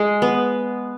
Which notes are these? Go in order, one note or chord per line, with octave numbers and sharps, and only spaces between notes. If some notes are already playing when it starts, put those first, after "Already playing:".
Already playing: G#3
B3